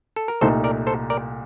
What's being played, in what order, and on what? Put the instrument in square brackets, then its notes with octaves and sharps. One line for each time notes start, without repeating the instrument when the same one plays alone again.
[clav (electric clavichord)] A4
A#4
[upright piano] C2 A#2 A3 D#4 [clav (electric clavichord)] A4 C5
[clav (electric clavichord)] A#4 D5
A4 C5
A#4 D5